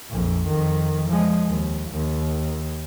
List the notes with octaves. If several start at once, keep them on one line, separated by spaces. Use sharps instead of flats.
A#1 F2
F2 D#3
F3 G#3
D#2
D#2